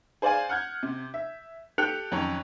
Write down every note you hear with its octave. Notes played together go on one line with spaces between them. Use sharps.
G#4 C5 D5 F5 G#5
F#5 F6 G6 G#6
C3
E5
G4 A4 F#6 C#7 F7
F2 D#3 F#3 C#4 C#5